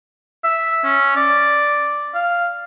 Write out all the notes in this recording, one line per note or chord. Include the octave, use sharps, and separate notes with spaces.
E5
C#4
D5
F5